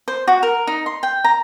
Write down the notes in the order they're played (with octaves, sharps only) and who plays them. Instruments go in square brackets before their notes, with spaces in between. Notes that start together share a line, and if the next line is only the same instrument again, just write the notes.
[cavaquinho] C5
F#4
A#4
D#4
C6
G5
A#5